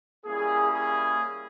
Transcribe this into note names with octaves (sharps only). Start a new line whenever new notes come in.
G3 A#3 C#4 E4 G#4
G#4